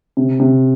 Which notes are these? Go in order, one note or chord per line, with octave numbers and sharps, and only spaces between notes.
C3
C3